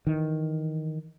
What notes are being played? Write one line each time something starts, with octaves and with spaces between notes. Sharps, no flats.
D#3 E3